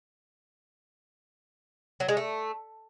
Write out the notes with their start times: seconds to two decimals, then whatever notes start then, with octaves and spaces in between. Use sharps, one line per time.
2.00 F#3
2.09 G#3
2.17 A3